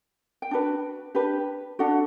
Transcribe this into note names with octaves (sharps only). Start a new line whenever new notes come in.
G5
D4 F#4 B4
D4 G4 B4
D4 F#4 A4 F#5